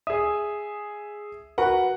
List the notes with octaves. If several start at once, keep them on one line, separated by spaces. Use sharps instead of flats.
G#4 E5 D#6
F#4 A#4 B4 F#5